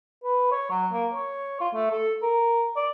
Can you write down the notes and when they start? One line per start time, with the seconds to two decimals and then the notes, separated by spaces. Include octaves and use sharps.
0.24 B4
0.52 C#5
0.71 F#3
0.93 A#3
1.14 C#5
1.61 F4
1.74 A3
1.91 A4
2.22 A#4
2.76 D5